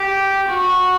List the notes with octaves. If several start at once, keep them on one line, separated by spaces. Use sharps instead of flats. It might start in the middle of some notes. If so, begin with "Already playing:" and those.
Already playing: G4
F#4